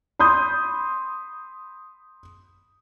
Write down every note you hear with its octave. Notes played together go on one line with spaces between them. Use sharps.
B5 C6 D#6 G6